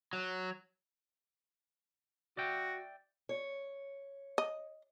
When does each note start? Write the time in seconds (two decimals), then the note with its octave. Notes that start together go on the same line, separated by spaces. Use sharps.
0.13 F#3
2.37 F#4 D5 E5 G5
3.29 C#5
4.38 D#5